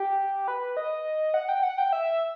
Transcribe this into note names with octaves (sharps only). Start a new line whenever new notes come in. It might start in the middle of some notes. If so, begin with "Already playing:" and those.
Already playing: G4
B4
D#5
F#5
G5
F#5
G5
E5